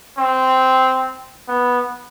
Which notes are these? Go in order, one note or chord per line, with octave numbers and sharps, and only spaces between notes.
C4
B3